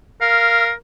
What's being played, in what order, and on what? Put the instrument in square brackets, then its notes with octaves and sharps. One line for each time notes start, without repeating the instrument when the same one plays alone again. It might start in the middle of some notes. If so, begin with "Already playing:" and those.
[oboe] A#4 [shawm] F5